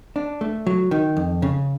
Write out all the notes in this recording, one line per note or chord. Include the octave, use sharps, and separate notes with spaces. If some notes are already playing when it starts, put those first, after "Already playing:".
D4
A3
F#3
D#3
F2
C#3